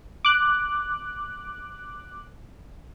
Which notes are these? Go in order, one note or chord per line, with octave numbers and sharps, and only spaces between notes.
D6 F#6